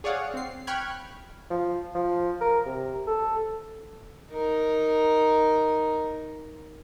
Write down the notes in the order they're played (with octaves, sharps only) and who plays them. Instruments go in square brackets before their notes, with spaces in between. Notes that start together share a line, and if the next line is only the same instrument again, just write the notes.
[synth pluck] G#4 C#5 D5 F5 F#5
C4 C7
G5 B5 C#6 F6 F#6 G#6
[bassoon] F3
F3
A#4
C3
A4
[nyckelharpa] D#4 A#4